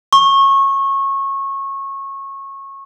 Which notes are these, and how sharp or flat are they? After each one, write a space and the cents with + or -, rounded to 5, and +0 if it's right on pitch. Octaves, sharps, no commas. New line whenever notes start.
C#6 -20